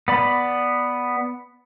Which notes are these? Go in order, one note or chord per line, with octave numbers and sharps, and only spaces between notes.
B3 D5 B5